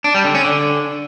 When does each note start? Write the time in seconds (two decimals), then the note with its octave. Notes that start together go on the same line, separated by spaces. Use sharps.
0.04 D4
0.14 G3
0.25 D3
0.35 C#4
0.45 D3